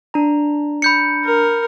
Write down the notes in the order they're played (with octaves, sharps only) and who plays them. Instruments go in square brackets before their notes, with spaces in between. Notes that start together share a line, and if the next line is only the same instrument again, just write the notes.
[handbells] D4 A#5
[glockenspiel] B5 G6 C#7
[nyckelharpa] A#4